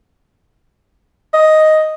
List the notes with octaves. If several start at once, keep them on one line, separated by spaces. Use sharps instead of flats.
D#5